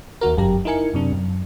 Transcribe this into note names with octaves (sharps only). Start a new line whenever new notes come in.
D#2 D#3 F#4 A#4
G1 F#2 G4 A#5
D#4 E4 A#4 G#5 C#7
F#2 C3 D4
F#2